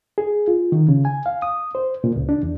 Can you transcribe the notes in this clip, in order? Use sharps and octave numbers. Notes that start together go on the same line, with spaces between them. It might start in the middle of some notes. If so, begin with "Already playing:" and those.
G#4
F4
D#3
C#3
G#5
F5
D#6
C5
A#2
C#2
D4
E2